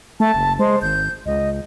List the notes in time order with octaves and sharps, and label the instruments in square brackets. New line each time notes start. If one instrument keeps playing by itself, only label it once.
[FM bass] A3 [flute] A5
[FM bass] F#1
[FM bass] G#3 [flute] C5
[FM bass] G#1 [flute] G6
[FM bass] C#2 [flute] D#5